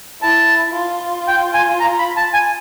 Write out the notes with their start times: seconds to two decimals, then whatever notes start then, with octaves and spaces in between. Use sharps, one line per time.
0.21 E4 A5
0.74 F4
1.28 G5
1.54 G#5
1.80 A#5
1.98 B5
2.16 A5
2.34 G#5